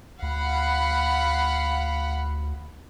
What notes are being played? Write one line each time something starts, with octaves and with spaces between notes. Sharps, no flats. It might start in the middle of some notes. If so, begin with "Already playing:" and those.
D2 F5 F#5 B5